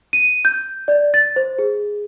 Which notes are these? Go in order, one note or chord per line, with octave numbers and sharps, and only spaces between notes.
D#7
G6
D5
A6
C5
G#4